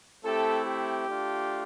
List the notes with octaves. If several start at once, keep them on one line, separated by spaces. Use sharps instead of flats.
A3 C4 E4 G4 A4
G4
A3 D4 F4